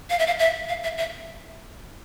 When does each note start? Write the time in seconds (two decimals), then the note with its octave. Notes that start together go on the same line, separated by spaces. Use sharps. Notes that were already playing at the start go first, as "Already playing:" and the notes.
0.10 F5
0.19 E5
0.27 F5
0.39 E5
0.69 F5
0.83 E5
0.97 E5